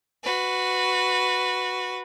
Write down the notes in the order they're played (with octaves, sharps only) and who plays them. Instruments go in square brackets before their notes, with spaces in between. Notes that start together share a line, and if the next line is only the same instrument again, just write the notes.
[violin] F#4 B4